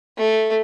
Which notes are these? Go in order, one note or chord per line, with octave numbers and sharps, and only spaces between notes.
A3